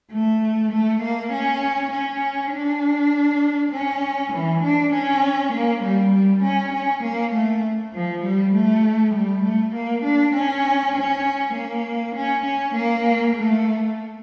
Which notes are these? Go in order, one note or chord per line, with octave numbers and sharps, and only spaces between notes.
A3
A3
A#3
C#4
C#4
D4
C#4
E3
D4
C#4
A#3
G3
G3
C#4
C#4
A#3
A3
F3
G3
A3
G3
A3
A#3
D4
C#4
C#4
A#3
C#4
C#4
A#3
A3